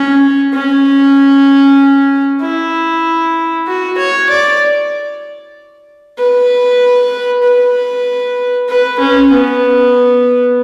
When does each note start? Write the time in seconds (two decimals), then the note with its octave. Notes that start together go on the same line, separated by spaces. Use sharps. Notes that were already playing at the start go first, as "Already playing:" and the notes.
Already playing: C#4
0.53 C#4
2.41 E4
3.67 F#4
3.98 C#5
4.30 D5
6.18 B4
7.43 B4
8.69 B4
9.00 C#4
9.31 B3